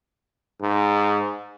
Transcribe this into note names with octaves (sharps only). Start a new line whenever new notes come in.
G#2